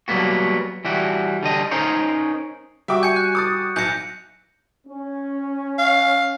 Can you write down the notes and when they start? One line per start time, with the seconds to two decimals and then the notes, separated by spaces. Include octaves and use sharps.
0.08 F#3 G3 A#3 B3 F#4
0.85 E3 G3 E4 F#4
1.43 D3 G3 D#5
1.71 C#4 D#4 A#4 C5 C#5
2.88 G3 F#4 E5 G5 D6
3.03 G#5 G6 C#7
3.16 F#6
3.35 D6 D#6 A6
3.76 B1 G6 A#6 C#7
4.86 C#4
5.78 F5